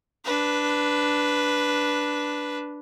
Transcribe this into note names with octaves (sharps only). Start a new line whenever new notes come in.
D4 B4